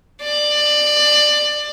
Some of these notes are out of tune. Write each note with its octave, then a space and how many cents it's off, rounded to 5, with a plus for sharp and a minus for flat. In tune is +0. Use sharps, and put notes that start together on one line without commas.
D5 +20